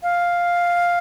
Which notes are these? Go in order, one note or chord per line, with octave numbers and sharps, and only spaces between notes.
F5